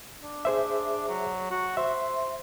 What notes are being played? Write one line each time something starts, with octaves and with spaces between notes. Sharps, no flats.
D4
G#4 C5 E5
F#3
F#4
C5 E5